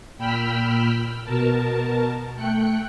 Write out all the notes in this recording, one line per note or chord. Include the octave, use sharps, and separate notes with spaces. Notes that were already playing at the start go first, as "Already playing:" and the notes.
A#2 G5 B5 E6 F6 B6
B2 A#4 A5
A3 G5 F#6 C#7